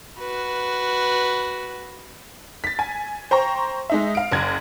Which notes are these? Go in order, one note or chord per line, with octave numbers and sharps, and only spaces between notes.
F#4 B4
A6 B6
G#5
C5 G5 A#5 C#6
G#3 D#4 E5
F5 D7
F#1 G#6